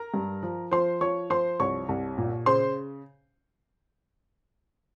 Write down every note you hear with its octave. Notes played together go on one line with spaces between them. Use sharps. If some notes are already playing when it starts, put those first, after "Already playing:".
Already playing: A#4 A#5
G2
F3
F3 C5 C6
F3 C#5 C#6
F3 C5 C6
C2 C#5 C#6
C2
A#2
C#3 C5 C6